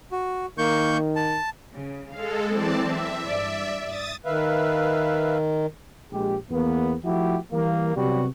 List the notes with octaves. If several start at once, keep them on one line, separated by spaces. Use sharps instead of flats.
F#4
D#3 A#3 C#6 G6
A5
C#3
G#3 A4 F5
E3 F#3 C4 D5 A5
E5
G2 D5
D#6 A6
D#3 B4 E5 F5
A#1 G#3 G4
E2 A#3 B3
F3 A3 E4 F#4 G4
E3 G3 A#3
C3 F#3 G3 B3 F#4